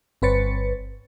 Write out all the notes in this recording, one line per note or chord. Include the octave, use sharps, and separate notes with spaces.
G1 C4 B4 C#5 A6 C#7